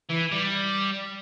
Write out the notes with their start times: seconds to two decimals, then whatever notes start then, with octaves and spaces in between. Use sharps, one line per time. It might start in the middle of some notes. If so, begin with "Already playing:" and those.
0.10 E3
0.32 G3